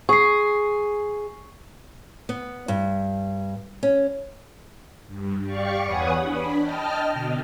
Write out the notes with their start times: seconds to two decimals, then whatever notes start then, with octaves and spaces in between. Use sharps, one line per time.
0.09 G#4 C#6 C7
2.29 B3
2.68 G2
3.83 C#4
5.07 G2
5.42 G4 D5 F5 C#6
5.84 E2 B4 C#5 F#5 G#5 D#6
6.18 D4 B5
6.58 D#5 G5 A5 F6
7.12 B2 D3